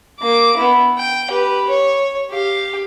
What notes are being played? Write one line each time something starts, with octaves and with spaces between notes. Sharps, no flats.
A#3 D6
B3 E4
G5
G4 B4
C#5
G4 F5